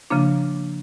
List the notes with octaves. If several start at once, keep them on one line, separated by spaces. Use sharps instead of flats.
C#3 F3 A#3 D4